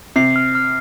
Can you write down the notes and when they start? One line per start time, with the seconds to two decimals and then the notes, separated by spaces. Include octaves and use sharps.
0.16 C3 C7
0.36 F6
0.55 F6